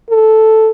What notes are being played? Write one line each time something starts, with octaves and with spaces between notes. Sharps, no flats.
A4